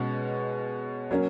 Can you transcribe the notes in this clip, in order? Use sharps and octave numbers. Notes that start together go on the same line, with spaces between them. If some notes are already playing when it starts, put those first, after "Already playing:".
Already playing: B2 G#3 C#4 F#4
F#3 A#3 C#4